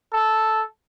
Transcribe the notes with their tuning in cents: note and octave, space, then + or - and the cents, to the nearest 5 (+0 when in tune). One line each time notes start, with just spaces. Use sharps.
A4 -5